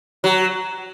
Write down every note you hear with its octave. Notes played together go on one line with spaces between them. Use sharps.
F#3